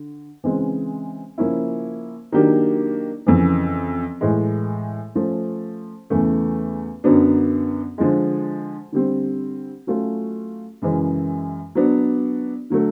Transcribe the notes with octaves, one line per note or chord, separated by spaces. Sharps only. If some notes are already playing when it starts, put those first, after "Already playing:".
Already playing: D3
C#3 E3 G#3 C4
C#3 F3 A#3 C#4 E4
D#3 F#3 A#3 D4 G4
F2 C#3 E3
A2 E3 G#3
F3 A3 C#4
E2 C#3 E3 A3
F#2 D3 F#3 B3 D4
D3 F3 G#3
D3 G3 C4
F#3 A3 C#4 F4
F#2 C#3 E3 G#3
F#3 B3 D4
D3 F#3 A3